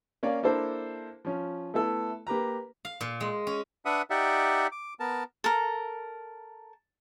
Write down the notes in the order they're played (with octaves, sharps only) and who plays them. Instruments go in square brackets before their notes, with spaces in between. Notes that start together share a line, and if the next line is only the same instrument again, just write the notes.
[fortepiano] A#3 C#4 C#5 D5 F5
A#3 D4 E4 A4 C5
F3 C#4 F4
A3 B3 E4 A4
A#3 G4 B4 A#5
[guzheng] F5
A#2
G#3
C#4
[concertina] D4 B4 E5 F#5 D#6
D#4 G4 D5 E5 F#5
D6
B3 A#4 A5
[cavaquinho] A4 A#4